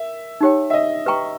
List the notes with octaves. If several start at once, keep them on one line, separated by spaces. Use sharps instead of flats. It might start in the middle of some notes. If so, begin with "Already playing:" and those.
Already playing: A#4 E5
D#4 G4 C#5 G5
E5
D#5
G4 B4 G5 A#5 C#6